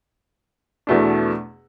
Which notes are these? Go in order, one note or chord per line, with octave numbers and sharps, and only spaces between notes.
E2 B2 A3 D4